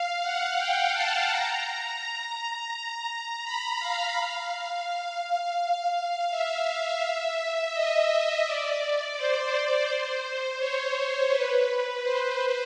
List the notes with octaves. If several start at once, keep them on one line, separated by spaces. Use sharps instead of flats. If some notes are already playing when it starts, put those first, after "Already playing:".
Already playing: F5
F#5
G5
A5
A#5
B5
F5
F5
E5
D#5
D5
C5
C#5
B4
C5